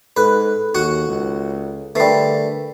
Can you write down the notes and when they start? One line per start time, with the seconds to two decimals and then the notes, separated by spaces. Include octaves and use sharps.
0.17 G#2 A4 B4 F#6
0.75 D#2 F#4 F#5
1.08 C#2
1.95 D3 G3 A3 A#4 B4 C7